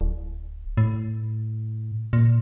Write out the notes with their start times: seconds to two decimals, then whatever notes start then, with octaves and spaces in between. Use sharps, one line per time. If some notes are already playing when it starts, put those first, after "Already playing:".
0.01 D1
0.77 A2
2.13 A#2